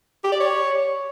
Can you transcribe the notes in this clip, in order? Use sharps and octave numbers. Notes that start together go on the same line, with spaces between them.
G4
D5
C#5